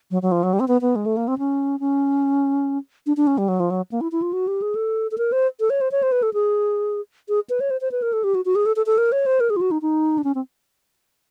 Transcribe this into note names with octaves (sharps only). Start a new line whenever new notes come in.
F#3
F#3
F3
F#3
G3
C4
B3
B3
G#3
A3
A#3
C4
C#4
C#4
D4
D4
C#4
G3
F#3
F3
F#3
A#3
E4
E4
F4
F#4
G4
G#4
A4
A4
A#4
C5
A4
C#5
C5
C#5
C5
B4
A4
G#4
G#4
B4
C#5
C5
C5
B4
A#4
A4
G4
F#4
F#4
G#4
A4
A4
A4
A#4
C#5
C5
A#4
G#4
F4
F#4
D#4
D#4
D4
C#4
C4